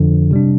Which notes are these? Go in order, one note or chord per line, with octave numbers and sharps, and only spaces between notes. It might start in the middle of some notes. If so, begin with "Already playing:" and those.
Already playing: F2 D3 F3
C3 G3 D4